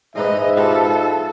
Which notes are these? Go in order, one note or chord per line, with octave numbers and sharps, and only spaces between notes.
G#2 G#3 D#4 B4 D#5 E5
F4 G4 A4 B4